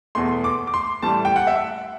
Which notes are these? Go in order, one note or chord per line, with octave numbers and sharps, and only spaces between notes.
E2 B2 A3 C6
D6
D6
C6
A1 A2 G3 A5
G5
F#5
E5